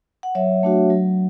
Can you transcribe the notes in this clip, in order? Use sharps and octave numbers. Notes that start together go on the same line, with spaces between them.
F#5
F#3 C#5 E5
A3 D4 F#4
F#3